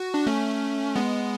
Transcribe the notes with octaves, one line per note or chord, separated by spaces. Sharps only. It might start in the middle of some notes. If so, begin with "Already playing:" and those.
Already playing: F#4
D4
A3 C#4
G#3 B3